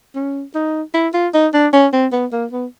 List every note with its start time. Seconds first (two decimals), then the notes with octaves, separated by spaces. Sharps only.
0.15 C#4
0.55 D#4
0.94 E4
1.14 F4
1.34 D#4
1.54 D4
1.73 C#4
1.93 C4
2.12 B3
2.32 A#3
2.52 B3